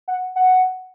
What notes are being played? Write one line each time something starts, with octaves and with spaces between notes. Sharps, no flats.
F#5
F#5